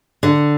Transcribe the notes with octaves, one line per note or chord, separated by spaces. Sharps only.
D3